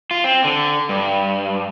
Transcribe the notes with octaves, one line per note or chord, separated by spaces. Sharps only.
F4
C4
D3
G2